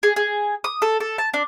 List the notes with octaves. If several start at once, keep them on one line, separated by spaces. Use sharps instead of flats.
G#4
G#4
D#6
A4
A4
A5
D4